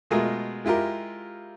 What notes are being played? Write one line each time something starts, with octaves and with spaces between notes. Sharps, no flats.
B2 G#3 A3 F4 G#4 A#4
G#3 E4 F4 G4 A#4